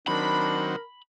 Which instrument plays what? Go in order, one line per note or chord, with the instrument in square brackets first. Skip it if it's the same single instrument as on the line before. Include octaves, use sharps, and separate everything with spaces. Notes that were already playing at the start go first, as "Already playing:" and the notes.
[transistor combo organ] D#3 F#3 C4 [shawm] D4 [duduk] A#4 [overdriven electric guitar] B5